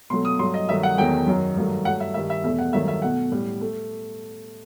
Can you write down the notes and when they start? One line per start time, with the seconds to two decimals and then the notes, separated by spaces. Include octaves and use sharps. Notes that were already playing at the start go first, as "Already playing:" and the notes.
0.10 B2 F#3 A3 C6
0.25 D#6
0.39 G2 F#3 A3 C6
0.54 D#5
0.69 G2 D#3 F#3 A3 E5
0.83 F#5
0.98 E2 D#3 F#3 A3 G5
1.27 F#2 D#3 F#3
1.56 G2 D#3 F#3 A3
1.85 G2 F#3 A3 F#5
2.00 E5
2.14 G2 D#3 G3 E5
2.30 E5
2.44 E2 B2 A3 E5
2.59 F#5
2.73 G2 D#3 F#3 A3 E5
2.88 E5
3.02 B2 A3 F#5
3.32 A2 G3
3.61 A3